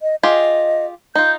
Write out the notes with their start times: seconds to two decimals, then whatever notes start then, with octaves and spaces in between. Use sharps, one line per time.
0.02 D#5
0.23 F4 G4 G#4 D#5
1.15 D#4 F4 G6